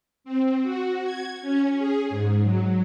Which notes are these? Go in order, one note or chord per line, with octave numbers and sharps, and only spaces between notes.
C4
F#4
G#6
C#4
G#4
G#2
F#3